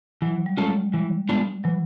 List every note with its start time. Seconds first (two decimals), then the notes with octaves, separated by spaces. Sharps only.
0.22 E3 F#3
0.46 G3
0.57 G#3 A3 C#4 F4 A4
0.93 E3 G3
1.29 G#3 B3 D4 F4
1.64 E3 F#3